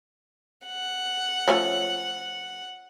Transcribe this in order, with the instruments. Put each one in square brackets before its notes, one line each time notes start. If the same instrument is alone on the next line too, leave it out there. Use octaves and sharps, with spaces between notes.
[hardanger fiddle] F#5
[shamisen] F3 A3 C#4